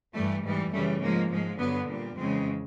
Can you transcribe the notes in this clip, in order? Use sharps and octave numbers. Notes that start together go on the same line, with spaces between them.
G2 E3 G3 A3
G#2 E3 G3
F#2 C#3 E3 G3 A3
G#2 F3 G#3 A#3
G#2 F3 G#3
G2 D3 F#3 B3
A#2 G3
F2 C#3 E3 G#3 C4